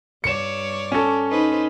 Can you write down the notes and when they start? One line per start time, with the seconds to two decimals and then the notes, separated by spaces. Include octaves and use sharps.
0.24 G2 C#5 D5 C#7 E7
0.92 C#4 A4
1.30 D#4 B4 C5